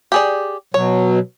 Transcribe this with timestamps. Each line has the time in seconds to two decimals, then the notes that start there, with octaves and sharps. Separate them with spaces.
0.12 G4 G#4 D5
0.74 B2 F#3 C#5